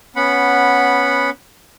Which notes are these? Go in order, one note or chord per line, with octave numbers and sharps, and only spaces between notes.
B3 C#4 F#5 B5